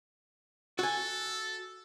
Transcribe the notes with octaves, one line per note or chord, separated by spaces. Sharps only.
F#4 A4 G#5